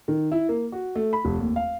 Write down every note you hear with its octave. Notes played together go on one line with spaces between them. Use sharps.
D#3
E4
A#3
F#4
A3
B5
F1
D#2
F5